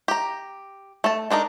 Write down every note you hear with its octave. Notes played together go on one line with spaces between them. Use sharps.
G4 A#5
A3 A5
G#3 D4 D#4 A#4